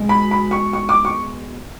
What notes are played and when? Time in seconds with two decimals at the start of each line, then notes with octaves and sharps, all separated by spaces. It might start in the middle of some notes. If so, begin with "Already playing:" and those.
Already playing: B2 G#3
0.09 B5
0.31 B5
0.51 C#6
0.73 C#6
0.89 D6
1.05 C#6